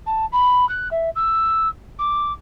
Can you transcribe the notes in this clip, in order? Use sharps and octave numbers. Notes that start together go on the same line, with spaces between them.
A5
B5
F#6
E5
E6
D6